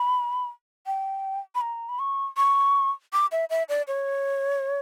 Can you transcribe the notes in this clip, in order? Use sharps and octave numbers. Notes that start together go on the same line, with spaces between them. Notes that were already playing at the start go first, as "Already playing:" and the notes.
Already playing: B5
G5
B5
A#5
B5
C#6
C#6
D6
E5
E5
D5
C#5